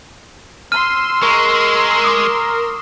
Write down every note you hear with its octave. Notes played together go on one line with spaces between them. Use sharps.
C6 E6 F6 D#7
G#3 A#4 C#6
D6 D#6